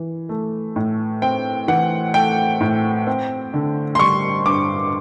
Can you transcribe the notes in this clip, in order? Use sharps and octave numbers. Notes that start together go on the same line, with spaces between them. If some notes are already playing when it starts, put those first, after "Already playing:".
Already playing: E3
A3
A2
C4 G5
E3 F#5
A3 G5
A2
C4
D3
C6
G3 C#6
G2 D6